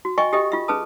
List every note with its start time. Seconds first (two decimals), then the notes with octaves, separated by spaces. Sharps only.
0.05 F#4
0.18 D#5 E5 G5 G#5 C#6
0.33 G4 A4 D#5 E5 G5
0.52 F4 E5
0.68 C#4 G#4 B4 A5 D#6